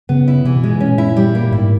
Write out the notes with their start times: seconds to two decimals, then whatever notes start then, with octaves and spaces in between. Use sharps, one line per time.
0.09 C#3 B3
0.28 E4
0.45 C3 E3
0.57 B2
0.64 G#3
0.69 A#2
0.80 C#4
0.98 E4
1.17 G3
1.35 A#3
1.52 G#2 E4